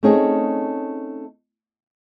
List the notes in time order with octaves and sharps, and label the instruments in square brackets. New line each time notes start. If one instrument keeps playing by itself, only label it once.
[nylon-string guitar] A3 C4 C#4 D#4 G#4